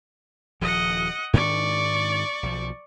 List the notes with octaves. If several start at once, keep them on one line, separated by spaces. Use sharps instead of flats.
D#1 F3 D#5 F#5
G#2 D#3 D4 D5 C#6
B1 F3